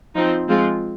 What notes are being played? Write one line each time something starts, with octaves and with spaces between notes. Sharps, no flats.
F3 C4 D#4
F3 G#3 C4 F4